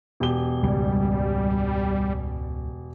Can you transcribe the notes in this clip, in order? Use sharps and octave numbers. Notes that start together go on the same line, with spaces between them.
E1 G4 G7
C#2 G#2 G3